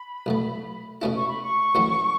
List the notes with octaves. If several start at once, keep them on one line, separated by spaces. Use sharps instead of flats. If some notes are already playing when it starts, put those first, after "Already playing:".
Already playing: B5
B1 A2 A3
B2 A3 C#4 E4
C#6
B5
C#6
A1 A2 F#3 C#4 E4